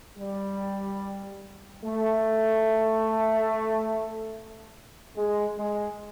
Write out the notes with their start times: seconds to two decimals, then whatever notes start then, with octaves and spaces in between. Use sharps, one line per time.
0.17 G3
1.84 A3
5.16 G#3
5.57 G#3